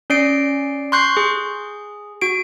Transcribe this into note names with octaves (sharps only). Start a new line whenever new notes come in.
C#4 D5 C7 D7
C6 C#6 F#6 G6 C7
G#4
F#4 D7